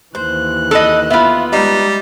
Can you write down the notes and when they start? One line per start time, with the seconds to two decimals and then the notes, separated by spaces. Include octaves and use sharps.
0.15 D#2 E3 C5 F#6
0.71 A4 B4 D#5
1.10 B3 F4 E5 F5 B5
1.53 G3 G#3 D#4